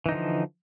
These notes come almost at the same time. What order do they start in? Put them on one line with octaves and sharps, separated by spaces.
E3 D#4 D3 F3